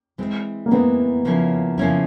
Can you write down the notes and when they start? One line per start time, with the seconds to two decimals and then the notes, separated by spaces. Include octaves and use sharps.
0.18 E3 G#3 C4
0.66 A#3
0.71 E3 G#3 B3 C4
1.25 C#3 F3 A#3 C#4 E4
1.78 C#3 F3 A#3 C#4 E4